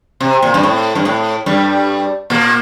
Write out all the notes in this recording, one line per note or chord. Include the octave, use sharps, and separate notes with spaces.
C3
A#2
G2
A2
G2
A2
G2 G3
A#2 A#3